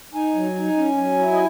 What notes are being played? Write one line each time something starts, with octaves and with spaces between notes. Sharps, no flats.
D#4 G#5
F#3
D#4
C#4
F#3
E4
D#5